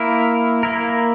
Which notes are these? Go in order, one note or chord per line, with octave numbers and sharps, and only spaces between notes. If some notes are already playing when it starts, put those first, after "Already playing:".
Already playing: A#3 E4 A#4
A#3 E4 A#4